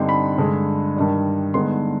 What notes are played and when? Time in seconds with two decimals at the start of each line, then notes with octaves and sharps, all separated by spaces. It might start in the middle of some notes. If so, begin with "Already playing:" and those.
Already playing: G2 D3 G3 C4 D#4 C6
0.09 B5
0.38 G2 D3 G#3
0.97 G2 D#3 G3
1.54 G2 D3 G#3 B3 D#4 C6